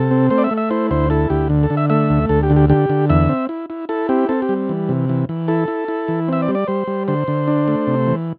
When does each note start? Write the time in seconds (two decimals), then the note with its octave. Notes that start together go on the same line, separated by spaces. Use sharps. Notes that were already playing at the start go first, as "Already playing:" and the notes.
Already playing: C3 A4
0.11 C4
0.30 A3 C5
0.38 D5
0.44 E5
0.51 A3
0.57 E5
0.70 E4 C5
0.91 D2 C5
1.10 E4 A4
1.30 D2 G4
1.50 D3
1.63 A4
1.70 D3
1.77 E5
1.90 A3 E5
2.10 D2
2.29 D2 A4
2.43 G4
2.50 D3
2.56 G4
2.70 D3 G4
2.90 D3
3.10 E2 E5
3.29 C4
3.49 E4
3.70 E4
3.89 E4 A4
4.09 C4 G4
4.29 C4 A4
4.42 G4
4.49 G3
4.69 E3
4.89 C3
5.09 E3
5.29 E3
5.48 E4 A4
5.68 E4
5.88 E4
6.08 E3
6.28 C4 E5
6.42 D5
6.48 G3
6.55 D5
6.67 G3 C5
6.87 G3
7.08 D3 C5
7.28 D3
7.48 D4
7.68 A3
7.87 C3
8.07 E3